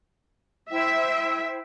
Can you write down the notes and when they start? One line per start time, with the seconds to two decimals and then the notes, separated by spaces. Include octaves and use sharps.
0.70 E4 C5 E5 G5